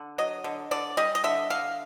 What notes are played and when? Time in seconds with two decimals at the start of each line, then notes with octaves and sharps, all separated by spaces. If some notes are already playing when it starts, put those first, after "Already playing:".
Already playing: D3
0.18 F#3 D#5
0.44 D3
0.71 D3 D5
0.97 G3 D#5
1.15 D#5
1.24 D3 E5
1.50 D3 F5